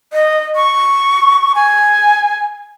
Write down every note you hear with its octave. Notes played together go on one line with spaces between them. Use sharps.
D#5
C#6
G#5